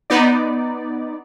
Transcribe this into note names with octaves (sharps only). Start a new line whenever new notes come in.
B3 D#4 D5